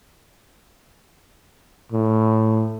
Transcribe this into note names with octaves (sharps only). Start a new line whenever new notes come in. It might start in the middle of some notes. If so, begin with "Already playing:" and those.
A2